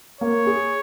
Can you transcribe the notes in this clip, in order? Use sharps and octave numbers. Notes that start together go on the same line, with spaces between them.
A#3 C#5
G#4